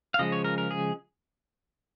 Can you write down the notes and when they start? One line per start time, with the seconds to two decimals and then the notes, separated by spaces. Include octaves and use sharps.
0.14 F5
0.19 C#3 F3 G#3 D#5
0.32 C#5
0.44 A#4
0.58 A#4
0.71 G#4